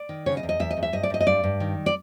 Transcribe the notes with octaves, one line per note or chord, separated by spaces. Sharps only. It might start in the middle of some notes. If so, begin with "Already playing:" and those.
Already playing: D5
D#3
C#3 C#5
D#5
E2
D#5
E2 E5
D#5
E2
E5
G2 D#5
D5
G2 D#5
D#5
G2 D5
G2
D#3
D5